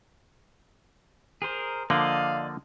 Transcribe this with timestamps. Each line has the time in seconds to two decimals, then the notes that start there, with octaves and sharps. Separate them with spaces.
1.42 G#4 A#4 C5
1.90 D3 F3 A#3 D5 D#5 F5